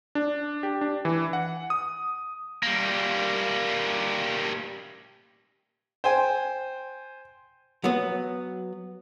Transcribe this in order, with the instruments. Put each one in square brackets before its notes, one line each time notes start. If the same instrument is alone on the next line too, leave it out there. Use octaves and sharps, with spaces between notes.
[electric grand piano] D4
G4
D4
E3
F#5
D#6
[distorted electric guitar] G3 A#3
[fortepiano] C5 G5 G#5
[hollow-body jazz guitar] F#3 B3